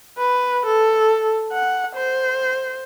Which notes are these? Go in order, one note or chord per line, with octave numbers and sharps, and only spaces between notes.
B4
A4
F#5
C5